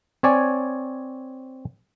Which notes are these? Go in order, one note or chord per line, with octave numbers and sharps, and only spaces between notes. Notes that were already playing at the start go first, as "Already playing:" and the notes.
C4 C#5 D5 G#5